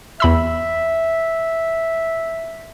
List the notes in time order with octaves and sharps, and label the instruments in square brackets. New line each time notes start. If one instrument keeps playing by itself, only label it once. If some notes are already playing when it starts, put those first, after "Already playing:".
[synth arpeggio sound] E2 B5 E6 [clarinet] E5